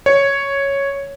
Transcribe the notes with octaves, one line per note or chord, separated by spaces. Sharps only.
C#5